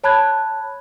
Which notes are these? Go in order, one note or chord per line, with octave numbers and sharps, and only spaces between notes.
C#5 A5 B5 F#6 G#6